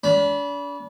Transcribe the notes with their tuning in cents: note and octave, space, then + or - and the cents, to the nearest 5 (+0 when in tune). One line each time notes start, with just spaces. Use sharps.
D4 -40 B5 -20